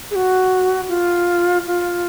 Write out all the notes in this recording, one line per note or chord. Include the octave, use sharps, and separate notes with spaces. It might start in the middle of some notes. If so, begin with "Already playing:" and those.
G#4
F#4
F4
F4